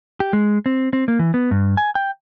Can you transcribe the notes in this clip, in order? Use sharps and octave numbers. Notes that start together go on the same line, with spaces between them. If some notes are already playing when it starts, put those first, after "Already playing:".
G4
G#3
C4
C4
A#3
E3
B3
G2
G#5
G5